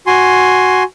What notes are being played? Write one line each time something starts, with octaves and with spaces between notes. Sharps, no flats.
F#4 G#5 C6